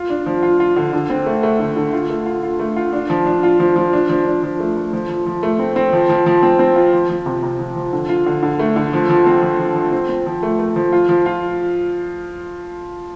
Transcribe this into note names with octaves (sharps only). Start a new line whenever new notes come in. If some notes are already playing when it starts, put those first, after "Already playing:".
Already playing: F4
D4
F3
F4
F4
D3
D3
C4
A3
A3
D3
D3
F4
A3
F4
F4
A3
F4
D4
F3
D4
F4
F3
F3
D4
F3
D4
F3
A3
A3
F3
F3
F3
A3
C4
C4
F3
F3
F3
C4
C4
F4
F3
F3
C3
C3
F3
F3
D3
F4
D3
D3
A3
D3
F3
F3
C4
F3
F3
F3
C4
C4
F3
A3
A3
F3
F4
F3
F4